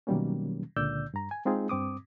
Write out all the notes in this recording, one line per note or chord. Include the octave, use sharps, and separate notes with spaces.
B2 D#3 F#3 G3 A#3 C#4
C#2 A#2 D3 D5 E6 G6
G2 A#5
G#5
G#3 C4 D#4 F4 G#4
G2 C4 D6 D#6